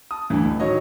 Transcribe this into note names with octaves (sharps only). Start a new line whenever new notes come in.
A5 D#6
D2 G2 E3
A1
D#3 F#3 C#5 D#5